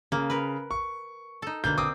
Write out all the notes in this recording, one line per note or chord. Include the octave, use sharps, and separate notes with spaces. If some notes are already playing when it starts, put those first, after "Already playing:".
C#3 A#3
A#4 B4
C#6
D#4 A4
B2 D3 A#3 G6
C4 D6 D#6